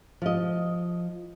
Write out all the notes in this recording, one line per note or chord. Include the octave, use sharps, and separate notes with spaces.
F3 D#5